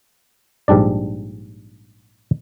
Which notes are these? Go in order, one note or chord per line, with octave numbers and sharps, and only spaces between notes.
A#1 G#2 G3 D4 D5